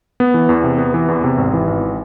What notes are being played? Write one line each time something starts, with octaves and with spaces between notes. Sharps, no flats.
B3
E3
E2
C3
B3
E3
E2
C3
G#1
E3
G#1